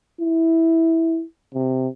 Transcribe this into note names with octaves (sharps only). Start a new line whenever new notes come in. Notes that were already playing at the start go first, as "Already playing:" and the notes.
E4
C3